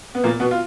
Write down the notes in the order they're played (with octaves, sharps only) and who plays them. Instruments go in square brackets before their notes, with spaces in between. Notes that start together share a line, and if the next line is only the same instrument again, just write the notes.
[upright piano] B3
A#2 A#3
B2 B3
F4